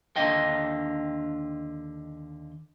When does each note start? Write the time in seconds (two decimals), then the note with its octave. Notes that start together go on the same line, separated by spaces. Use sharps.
0.16 D#2 D3 D4 F4 D#5 G5